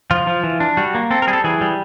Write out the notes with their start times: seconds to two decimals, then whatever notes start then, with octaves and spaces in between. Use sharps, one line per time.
0.11 F3 F4
0.27 F3
0.43 E3
0.60 D4
0.77 G3 F#4
0.95 A#3
1.11 C4 A4
1.22 A#4
1.27 G3 G#4
1.33 A4
1.44 E3 G#4
1.61 G3